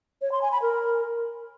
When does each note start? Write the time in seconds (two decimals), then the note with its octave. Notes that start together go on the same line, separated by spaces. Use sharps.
0.22 C#5
0.32 C6
0.42 G#5
0.52 B5
0.62 A#4